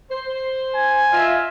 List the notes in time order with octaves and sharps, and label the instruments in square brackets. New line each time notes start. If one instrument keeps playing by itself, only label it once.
[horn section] C5
[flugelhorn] G#5
[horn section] F4 D#5 E5